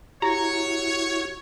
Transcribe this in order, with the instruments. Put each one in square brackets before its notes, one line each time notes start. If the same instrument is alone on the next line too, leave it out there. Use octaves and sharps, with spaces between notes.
[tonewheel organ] E4 F#4 [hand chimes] G4 [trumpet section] C#5 [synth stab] A#5